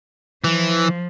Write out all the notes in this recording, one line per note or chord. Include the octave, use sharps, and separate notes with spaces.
E3 F3